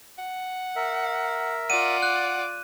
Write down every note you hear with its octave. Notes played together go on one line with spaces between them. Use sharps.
F#5
A#4 E5
F4 D5 F#5 D#7
F#6